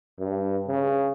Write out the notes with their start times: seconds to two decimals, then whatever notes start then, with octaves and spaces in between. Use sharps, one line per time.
0.19 G2
0.68 C#3